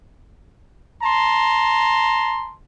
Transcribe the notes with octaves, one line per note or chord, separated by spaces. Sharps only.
A5 A#5 C6